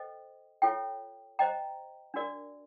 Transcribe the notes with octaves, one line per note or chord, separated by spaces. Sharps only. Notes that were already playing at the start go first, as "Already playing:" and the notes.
Already playing: A4 C5 D#5 G5
F4 A4 C#5 E5 G5
C5 D#5 G5 A#5
D4 F#4 A#4 D5